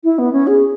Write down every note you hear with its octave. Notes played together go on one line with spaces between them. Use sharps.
E4
B3
C#4
G#4